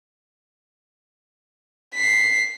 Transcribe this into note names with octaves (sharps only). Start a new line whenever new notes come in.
B6 C7